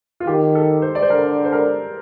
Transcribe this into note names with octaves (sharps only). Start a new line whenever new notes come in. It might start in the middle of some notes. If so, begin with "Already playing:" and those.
F4
D#3 G4
A4
C5
D5
C5
D3 A#4
C5
A#4